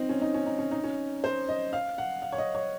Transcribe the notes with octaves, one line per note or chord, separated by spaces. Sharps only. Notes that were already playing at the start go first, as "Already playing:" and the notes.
Already playing: C4 D#4
C#4
D#4
C#4
D#4
C#4
D#4
C#4
C5
D#5
F5
F#5
F5
C#5
D#5
C#5